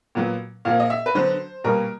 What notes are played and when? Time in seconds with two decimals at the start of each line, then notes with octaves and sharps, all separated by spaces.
0.15 A#2 F#3 B3
0.65 A#2 F3 A#3 F5
0.80 D#5
0.90 E5
1.06 B4
1.15 D3 F#3 B3 C5
1.64 B2 G3 A#3 A#4